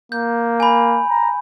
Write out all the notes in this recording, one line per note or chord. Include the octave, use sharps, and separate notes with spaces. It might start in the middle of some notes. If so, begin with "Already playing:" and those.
A#3 G6
G#5 B5
A#5